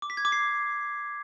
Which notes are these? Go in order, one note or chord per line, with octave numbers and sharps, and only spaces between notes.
D6
B6
G#6
D6
C7